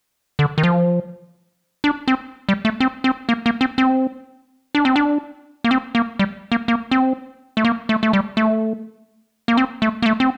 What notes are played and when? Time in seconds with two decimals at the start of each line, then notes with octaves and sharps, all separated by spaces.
0.39 D3
0.58 D#3
0.63 F3
1.84 D4
2.08 C4
2.49 G3
2.65 A3
2.80 C4
3.04 C4
3.29 A#3
3.46 A#3
3.61 C4
3.78 C4
4.75 D4
4.85 C4
4.96 D4
5.64 A#3
5.71 C4
5.95 A#3
6.19 G3
6.52 A#3
6.68 A#3
6.91 C4
7.57 A3
7.65 A#3
7.89 A3
8.03 A3
8.13 G3
8.37 A3
9.48 A#3
9.57 C4
9.82 A3
10.02 A#3
10.06 A3
10.20 C4